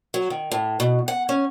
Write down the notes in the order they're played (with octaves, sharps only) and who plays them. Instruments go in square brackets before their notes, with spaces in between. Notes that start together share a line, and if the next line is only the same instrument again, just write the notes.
[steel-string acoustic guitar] F#3
D#3
A2
B2
F#5
C#4